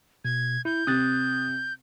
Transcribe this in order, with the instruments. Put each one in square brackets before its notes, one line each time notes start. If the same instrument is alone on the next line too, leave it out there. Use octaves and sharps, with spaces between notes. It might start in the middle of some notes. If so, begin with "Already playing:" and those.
[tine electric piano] B2 [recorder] G#6
[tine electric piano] E4 [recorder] G6
[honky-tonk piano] C3 [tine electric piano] D#6 F#6 A6